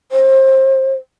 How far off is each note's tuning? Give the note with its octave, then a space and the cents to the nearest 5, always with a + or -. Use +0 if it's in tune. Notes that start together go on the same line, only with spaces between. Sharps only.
C5 +30